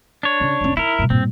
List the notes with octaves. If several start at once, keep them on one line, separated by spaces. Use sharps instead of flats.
D4 C#5
C#3 C#4
F1 C#4
D#4 E4 A#4
G2 B2
G2 A#2 C4